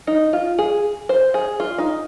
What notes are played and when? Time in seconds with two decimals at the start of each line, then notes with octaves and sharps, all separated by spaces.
0.07 D#4
0.33 F4
0.58 G#4
1.09 C5
1.34 G#4
1.60 F4
1.78 D#4